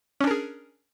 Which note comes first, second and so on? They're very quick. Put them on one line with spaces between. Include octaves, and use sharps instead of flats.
C#4 D4 A#4 G#4